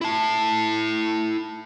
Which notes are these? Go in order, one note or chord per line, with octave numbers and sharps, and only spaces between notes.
E4 A5